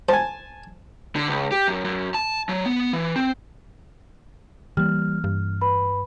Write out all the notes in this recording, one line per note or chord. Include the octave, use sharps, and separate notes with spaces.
C5 G#5 A5
D3
C#2
G4
F#2
F#2
A5
F#3
B3
E3
C4
E3 G3 A#3 F6
G2
B4 B5